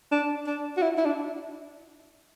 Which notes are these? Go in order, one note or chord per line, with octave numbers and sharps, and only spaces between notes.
D4
D4
F#4
E4
E4
D4